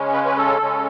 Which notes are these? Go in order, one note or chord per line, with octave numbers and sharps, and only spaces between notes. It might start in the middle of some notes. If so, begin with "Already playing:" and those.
Already playing: C#3 G#3 C#4
B4
B4
A4
C#3 G#3 C#4